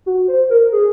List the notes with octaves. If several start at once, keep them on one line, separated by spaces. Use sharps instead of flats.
F#4
C5
A#4
G#4